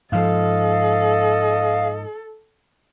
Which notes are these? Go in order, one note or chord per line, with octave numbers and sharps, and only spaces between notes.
G#2 F3 A4 D#5 F5